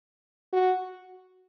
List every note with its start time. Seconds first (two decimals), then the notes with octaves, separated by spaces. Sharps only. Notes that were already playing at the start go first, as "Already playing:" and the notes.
0.53 F#4